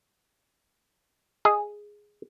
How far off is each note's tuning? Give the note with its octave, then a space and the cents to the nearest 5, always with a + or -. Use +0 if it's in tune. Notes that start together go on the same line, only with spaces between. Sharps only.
G#4 +0 D#5 +0